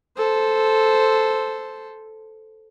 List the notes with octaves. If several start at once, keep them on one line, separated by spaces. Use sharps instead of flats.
A4 C5